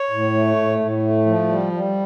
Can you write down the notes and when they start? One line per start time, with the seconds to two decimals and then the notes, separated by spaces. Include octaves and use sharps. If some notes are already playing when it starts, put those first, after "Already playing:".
Already playing: C#5
0.10 A2
0.34 A3
0.56 A2
0.79 A2
1.03 A3
1.26 F3
1.48 G3
1.73 G3